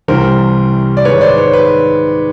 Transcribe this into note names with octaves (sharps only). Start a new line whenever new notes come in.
C2 C3 E3 G3 A#4 C5
D5
G#2 D#3 G#3 B4 C#5
C5 D5
B4 C#5
B4